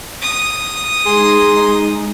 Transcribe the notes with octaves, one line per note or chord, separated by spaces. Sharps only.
D#6
G#3 D#4 G#4 C6